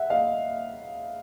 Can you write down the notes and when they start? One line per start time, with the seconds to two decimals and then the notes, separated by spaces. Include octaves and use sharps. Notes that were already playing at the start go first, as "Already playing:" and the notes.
Already playing: E5 F#5
0.10 D#5 F5